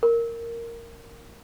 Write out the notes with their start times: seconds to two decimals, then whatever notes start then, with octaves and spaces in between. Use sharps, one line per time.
0.03 A#4